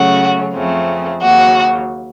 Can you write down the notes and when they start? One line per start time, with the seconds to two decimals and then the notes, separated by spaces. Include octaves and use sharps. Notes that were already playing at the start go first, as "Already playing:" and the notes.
Already playing: C#3 F#3 A3 C#4 F#4
0.54 F2 C#3 A3 C4
1.21 D#2 C#3 F#3 F#4